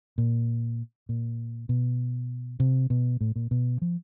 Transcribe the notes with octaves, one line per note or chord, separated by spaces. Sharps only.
A#2
A#2
B2
C3
B2
A2
A#2
B2
F3